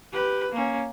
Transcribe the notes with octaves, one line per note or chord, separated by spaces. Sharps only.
G4 B4
A#3 C#4